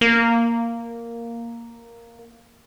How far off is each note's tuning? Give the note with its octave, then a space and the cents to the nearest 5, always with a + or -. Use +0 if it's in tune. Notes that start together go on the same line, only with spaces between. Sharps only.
A#3 -5